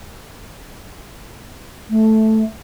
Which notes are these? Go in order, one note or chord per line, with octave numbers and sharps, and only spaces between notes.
A3